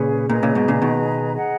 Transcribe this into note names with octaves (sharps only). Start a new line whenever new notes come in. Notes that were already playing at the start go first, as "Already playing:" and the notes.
Already playing: A#2 C#3 C#4 G#4 B4
A#2 G#4 B4 D#5 A#5
A#2 C#3
G#2 B2
A#2 C#3
B2 D#3
G#4 D#5 F#5 A#5